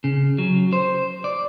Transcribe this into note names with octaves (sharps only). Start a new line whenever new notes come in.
C#3
F#3
C5
D5